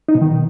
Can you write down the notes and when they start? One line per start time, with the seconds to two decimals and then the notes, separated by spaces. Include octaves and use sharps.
0.09 D#4
0.15 B2
0.21 D#3